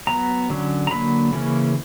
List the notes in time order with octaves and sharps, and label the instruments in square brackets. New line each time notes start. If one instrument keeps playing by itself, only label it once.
[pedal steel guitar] F#3 B3 A#5
D3 F#3 C#4
A#5
D3 F#3 A#3 B5
C#3 E3 A#3 C#4